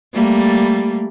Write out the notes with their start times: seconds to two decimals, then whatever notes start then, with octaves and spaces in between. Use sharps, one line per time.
0.14 G3 A3 A#3